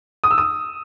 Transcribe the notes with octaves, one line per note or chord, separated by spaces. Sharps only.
D#6
E6
D#6